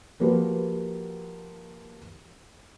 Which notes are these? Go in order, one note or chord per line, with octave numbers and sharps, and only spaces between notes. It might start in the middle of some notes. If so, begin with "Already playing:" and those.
F3 A#3 F#4 G4 B4